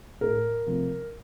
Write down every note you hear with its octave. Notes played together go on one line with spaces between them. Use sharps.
A2 A3 A#4
C3 F3 A3